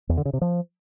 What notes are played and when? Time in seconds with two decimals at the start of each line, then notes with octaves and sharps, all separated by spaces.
0.09 E2
0.17 D3
0.25 C#3
0.33 C3
0.41 F3